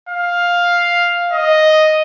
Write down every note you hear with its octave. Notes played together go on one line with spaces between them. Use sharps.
F5
D#5